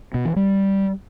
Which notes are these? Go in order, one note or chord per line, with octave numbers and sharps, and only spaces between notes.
B2
E3
G3